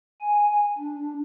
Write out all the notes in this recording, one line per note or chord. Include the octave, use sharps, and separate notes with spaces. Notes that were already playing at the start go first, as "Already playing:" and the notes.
G#5
D4